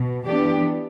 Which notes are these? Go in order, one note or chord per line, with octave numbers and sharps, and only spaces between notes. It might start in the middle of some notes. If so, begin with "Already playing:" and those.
Already playing: B2
E3 B3 D4 G4